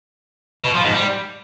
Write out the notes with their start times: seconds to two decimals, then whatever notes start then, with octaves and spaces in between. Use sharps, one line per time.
0.65 B2
0.74 F3
0.84 G#2
0.94 G3